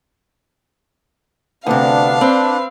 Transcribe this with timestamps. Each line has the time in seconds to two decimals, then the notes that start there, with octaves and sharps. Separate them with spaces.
1.66 D2 C3 B3 D4 F5
2.21 C4 B4